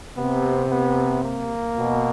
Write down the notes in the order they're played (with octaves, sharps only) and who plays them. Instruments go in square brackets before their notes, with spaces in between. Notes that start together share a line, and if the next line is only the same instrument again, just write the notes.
[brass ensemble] C3 [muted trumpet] B3
[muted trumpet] B3
A#3
[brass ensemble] B2